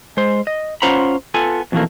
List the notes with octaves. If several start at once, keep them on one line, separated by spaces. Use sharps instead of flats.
G#3 C5
D#5
C#4 F4 C5 F#5 A#5 B5
B3 F4 A4 G#5
F2 B2 E3 F3 A3 A#3